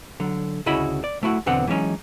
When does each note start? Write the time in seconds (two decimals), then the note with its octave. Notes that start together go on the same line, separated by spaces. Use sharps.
0.20 D3 F#3
0.66 D2 C#3 E4 F#4 D#5 B5
1.04 D5
1.23 A3 E4 F#4
1.46 B1 E2 D3 B3 C4 F#5
1.67 E3 F#3 G#3 C#4 D#4